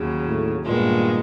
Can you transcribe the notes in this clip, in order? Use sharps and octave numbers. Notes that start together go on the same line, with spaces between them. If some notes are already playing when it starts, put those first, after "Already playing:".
Already playing: D#2 C#3 F#3
A2
G2 A#2 D#3 G#3 B3